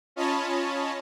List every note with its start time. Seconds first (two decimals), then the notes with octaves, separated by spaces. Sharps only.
0.16 C#4 F4 C#5 D#5 A5 B5